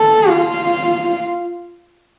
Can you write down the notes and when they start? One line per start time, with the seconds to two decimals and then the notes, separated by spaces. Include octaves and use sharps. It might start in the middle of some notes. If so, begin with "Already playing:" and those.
Already playing: A4
0.29 F4